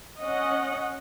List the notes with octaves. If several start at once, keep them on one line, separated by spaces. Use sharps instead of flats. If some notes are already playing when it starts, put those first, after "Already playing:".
C#4 D#5 F#5